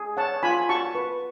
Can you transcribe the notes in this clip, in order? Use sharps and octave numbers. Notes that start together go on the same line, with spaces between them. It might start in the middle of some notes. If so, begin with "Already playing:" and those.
Already playing: G#4
C#5 F#5 A5
F4 G#5 B5
F#4 A5 C#6
B4